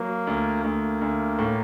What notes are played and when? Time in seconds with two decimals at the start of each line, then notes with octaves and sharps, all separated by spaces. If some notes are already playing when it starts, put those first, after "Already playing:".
Already playing: F#3 A#3
0.27 D2
0.64 D2 A#3
1.01 D2
1.39 A2